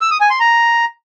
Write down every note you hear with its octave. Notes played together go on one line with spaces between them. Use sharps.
E6
D#6
G#5
C6
A#5